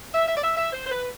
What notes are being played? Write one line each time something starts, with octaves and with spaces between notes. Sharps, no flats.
E5
E5
D5
E5
E5
C5
C5
B4